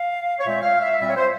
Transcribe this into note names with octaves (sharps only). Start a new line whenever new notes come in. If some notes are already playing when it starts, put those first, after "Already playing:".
Already playing: F5
C#5
A#2 G#3 C4 E5
F5
E5
A#2 G3 C4 E5
C#5
C5